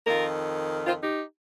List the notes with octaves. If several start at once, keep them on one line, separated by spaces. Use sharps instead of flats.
F2 D#3 F4 A#4
C4 F4
D#4 G4